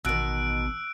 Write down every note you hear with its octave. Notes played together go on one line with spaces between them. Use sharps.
A1 B2 D#3 E6 F#6 D7